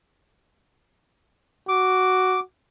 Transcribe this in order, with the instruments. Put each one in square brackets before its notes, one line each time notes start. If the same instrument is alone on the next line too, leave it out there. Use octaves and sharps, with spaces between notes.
[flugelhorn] F#4 [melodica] D6